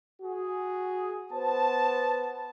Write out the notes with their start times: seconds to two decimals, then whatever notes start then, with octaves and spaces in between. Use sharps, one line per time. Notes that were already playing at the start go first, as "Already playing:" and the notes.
0.21 F#4 G#4
1.33 B3 C5 A5